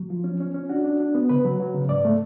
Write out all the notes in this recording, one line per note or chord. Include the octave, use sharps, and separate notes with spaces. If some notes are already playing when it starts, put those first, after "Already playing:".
Already playing: F#3
F3 F4
C#4
C#4
C#4
D4 F#4
D4
D4
B3
C#3 B4
F#3
F#3
C#3
G#2 D5
A3